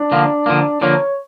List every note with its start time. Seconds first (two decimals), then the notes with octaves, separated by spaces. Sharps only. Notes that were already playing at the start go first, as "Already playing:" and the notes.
Already playing: D4
0.12 D3 F3 A#3
0.46 D3 F3 A#3
0.81 D3 F3 A#3 C#5